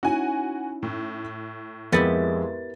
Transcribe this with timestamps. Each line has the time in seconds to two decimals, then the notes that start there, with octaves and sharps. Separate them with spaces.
0.03 C#4 D#4 E4 F#4 G#5
0.83 A2
1.92 F2 G#3 B3 E4 G4 A#4 A6